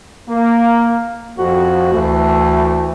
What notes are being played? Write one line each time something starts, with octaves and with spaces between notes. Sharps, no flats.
A#3
F2 F#4
D2 E3 A3